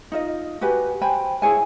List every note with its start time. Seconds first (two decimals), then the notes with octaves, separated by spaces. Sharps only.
0.12 D#4 F4 D#5
0.61 F#4 G4 B4 G#5
1.01 C5 G5 G#5 B5
1.42 E4 G#4 C#5 G#5